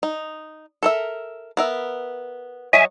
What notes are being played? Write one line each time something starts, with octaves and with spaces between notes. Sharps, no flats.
D#4
A4 A#4 E5
B3 A#4 E5
F#3 C#5 D#5 E5 G#5